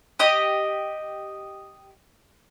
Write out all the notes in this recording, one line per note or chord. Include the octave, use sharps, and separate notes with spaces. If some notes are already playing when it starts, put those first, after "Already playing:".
G4 D#5 D#6